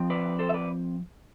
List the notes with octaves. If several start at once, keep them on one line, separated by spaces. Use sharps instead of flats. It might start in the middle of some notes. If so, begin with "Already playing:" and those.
Already playing: F3 C4
B4 D5
A4 C5
E5
B4 D5